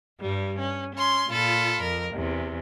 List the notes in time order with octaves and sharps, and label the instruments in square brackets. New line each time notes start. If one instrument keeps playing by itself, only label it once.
[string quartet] G2 G3
C#4
C#4 C6
A#2 F4 A4 B5
F2 A#4
E2 C3